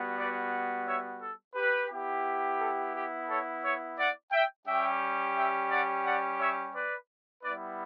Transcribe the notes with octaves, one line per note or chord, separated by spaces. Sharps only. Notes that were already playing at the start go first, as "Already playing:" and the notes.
Already playing: G3 B3 F#4
B4 D5
C#5 E5
A4
G4 B4
B3 E4 G4
A4
G4
A4 C#5
C#5 E5
D5 F#5
E5 G5
G3 C#4 G4 E5 G5
E5 G5
D5 F#5
D5 F#5
C#5 E5
B4 D5
G3 B3 E4 B4 D5